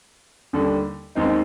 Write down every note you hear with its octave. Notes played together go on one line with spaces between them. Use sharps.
D#2 D3 G3
D#2 D#3 G#3 C4 D#4